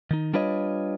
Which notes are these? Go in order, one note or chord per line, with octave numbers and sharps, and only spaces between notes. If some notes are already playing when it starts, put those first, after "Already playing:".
D#3 D#4
G3 D4 F4 B4 C#5 D#5